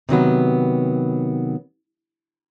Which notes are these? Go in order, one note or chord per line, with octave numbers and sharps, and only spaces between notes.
C3 D#3 F#3 B3